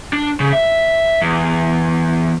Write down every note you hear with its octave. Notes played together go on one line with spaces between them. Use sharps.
D4
C#3
E5
E2